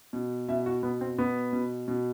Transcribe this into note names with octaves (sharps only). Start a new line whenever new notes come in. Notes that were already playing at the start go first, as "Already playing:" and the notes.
B2
B2 E5
F#4
B2 B3
C4
B2 B3
B2
B2